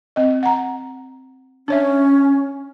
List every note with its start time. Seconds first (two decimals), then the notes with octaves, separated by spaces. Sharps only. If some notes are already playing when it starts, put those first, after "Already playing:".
0.16 C4 D#5
0.43 F#5 A#5
1.68 C#4 D4 C#5 E5